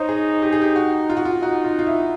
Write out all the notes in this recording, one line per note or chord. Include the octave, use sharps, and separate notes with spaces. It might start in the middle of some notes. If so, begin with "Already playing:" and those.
Already playing: D#4 C5 C#5 D#5
G#4
G4
G#4
G4
F#4
F4
F#4
F4
D#4 F#4
F4
F4
E4